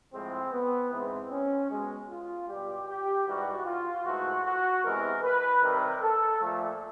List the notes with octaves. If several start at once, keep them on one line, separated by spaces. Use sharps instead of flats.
A2 F3 G#3 C4
B3
G#2 E3 G#3 C4
C#4
B2 G#3
F4
B2 G3 G4
G4
G#2 E3 G3 F#4
F4
G#2 E3 A3 F#4
F#4
E2 C3 E3 G#3 A#4
B4
C3 D#3 G3 A#4
A4
A#2 F3 A3